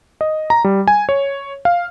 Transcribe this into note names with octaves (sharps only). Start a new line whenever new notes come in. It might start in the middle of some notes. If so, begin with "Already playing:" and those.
D#5
A#5
G3
G#5
C#5
F5